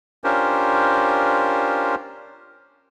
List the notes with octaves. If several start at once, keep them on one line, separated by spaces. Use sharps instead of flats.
C#4 D4 F4 G4 A#4 C5